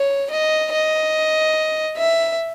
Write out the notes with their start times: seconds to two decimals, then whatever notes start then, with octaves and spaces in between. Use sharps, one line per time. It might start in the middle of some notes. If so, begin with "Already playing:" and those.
Already playing: C#5
0.31 D#5
0.72 D#5
1.97 E5